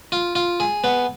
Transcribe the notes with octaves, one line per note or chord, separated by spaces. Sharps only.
F4
F4
G#4
B3